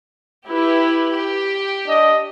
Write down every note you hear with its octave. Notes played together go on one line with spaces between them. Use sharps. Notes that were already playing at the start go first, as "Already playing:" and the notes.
E4 G4 B4
G4
D4 D#5